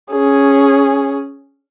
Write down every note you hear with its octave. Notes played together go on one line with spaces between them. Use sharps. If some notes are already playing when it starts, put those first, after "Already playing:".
C#4 G#4